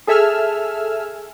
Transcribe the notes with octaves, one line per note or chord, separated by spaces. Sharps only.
G#4 A4 E5 G#5 E6 F6